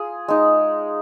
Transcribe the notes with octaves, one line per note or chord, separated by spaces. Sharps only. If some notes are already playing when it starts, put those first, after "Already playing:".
Already playing: F4 G#4
G#3 D#4